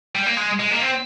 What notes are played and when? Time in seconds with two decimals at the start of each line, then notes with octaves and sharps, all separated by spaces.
0.15 G3
0.26 A#3
0.37 G#3
0.60 G#3
0.71 A#3
0.82 C4